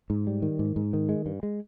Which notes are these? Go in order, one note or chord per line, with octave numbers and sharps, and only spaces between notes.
G#2
G3
D#3
G#2
G#2
D#3
G#3
G2
G#3